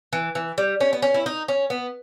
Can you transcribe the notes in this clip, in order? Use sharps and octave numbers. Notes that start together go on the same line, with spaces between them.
E3
E3
G3
C#4
B3
C#4
E4
D#4
C#4
B3